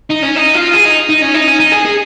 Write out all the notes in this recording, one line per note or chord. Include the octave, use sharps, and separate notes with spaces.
D#4
C#4
D#4
F4
G#4
D#4
D#4
C#4
D#4
C#4
D#4
G#4
G#4